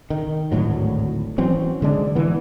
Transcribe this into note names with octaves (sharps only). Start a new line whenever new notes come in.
D#3
G#1 D2 A2 F#3
E3 F#3 C4 C#4
D3 G#3 D4
E3 B3